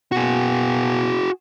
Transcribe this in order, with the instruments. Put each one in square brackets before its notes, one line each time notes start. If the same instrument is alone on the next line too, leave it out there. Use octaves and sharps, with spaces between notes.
[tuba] B2 [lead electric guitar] F#4 G#4